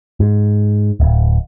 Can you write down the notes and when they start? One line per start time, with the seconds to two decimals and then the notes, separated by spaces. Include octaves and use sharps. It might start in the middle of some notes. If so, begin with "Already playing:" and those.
0.20 G#2
1.00 D1